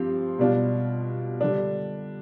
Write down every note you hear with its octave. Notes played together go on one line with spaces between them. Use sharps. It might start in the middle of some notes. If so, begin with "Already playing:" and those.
Already playing: G2 F3 C4 G4
B2 G3 D4 F4
D3 G3 D4